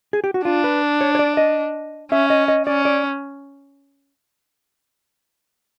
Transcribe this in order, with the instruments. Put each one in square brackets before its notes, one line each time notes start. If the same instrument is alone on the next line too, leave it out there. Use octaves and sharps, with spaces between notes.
[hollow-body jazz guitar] G#4
G4
F#4
[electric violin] D4 [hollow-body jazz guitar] F4
[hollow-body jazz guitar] B4
C#5
C#5
D5
D#5
[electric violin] C#4 [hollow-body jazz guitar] E5
[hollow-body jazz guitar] D#5
D#5
[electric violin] C#4 [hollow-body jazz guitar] D5
[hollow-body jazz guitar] D5